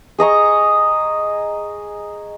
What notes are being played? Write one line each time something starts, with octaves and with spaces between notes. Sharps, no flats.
G#4 D#5 A#5 C#6